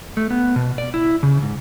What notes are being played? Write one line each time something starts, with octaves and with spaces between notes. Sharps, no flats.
A3
B3
B2
D5
E4
C#3
G#2